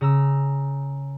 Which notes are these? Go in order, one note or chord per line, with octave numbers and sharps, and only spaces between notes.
C#3 A#5 E6